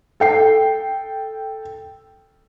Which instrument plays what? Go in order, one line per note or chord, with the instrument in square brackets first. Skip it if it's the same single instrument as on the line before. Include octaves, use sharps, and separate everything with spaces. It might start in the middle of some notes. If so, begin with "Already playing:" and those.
[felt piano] A4 G5 C7